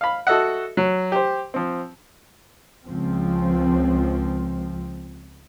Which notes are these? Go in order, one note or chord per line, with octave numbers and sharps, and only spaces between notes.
F5 B5
F#4 A4 D#5 E5 F#5
F#3
G4 C5
F3 C4
C#2 F3 C4